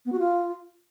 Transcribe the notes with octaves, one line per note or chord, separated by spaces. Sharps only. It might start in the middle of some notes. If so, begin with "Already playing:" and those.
B3
F#4
F4